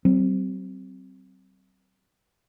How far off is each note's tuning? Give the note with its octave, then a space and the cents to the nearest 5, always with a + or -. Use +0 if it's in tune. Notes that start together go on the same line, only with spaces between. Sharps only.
F#3 +45 C4 +0